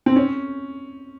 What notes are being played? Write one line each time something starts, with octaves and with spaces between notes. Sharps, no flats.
C4
C#4